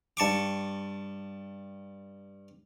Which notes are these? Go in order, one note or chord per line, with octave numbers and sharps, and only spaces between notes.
G2 A5 C#6 D6